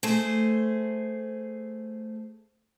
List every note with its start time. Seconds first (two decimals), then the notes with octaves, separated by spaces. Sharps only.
0.03 A3 G#4 C5